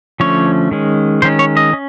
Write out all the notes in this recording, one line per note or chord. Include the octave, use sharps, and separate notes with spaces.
D3 F3 A3 C#4 C#5
D#3 G#3 C#4
D#3 G#3 C#4 C5
C#5
D#5
C#4